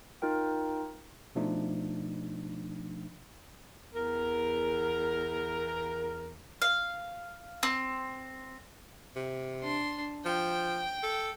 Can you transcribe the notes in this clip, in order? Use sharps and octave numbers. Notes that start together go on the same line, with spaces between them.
D#4 F4 A#4 G5
B2 F3 A3 D4 D#4
E2 A#4
F5
C4
C3
D4 C6
F3 G5
A4